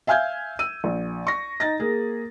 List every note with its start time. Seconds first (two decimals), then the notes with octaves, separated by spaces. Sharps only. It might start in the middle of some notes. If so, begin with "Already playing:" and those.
0.07 E5 F5 G#5 F6 G6 G#6
0.59 E6 D#7
0.84 A#1
1.27 C#6 A#6
1.60 D#4 A6 A#6
1.80 A#3 G#4